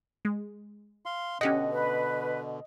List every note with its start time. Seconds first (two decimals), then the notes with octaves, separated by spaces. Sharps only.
0.25 G#3
1.06 F5 C6
1.41 B2 D3 C#4 G4 D#5 F#5
1.72 B4